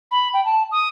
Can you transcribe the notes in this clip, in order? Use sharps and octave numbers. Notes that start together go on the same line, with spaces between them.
B5
G5
A5
D#6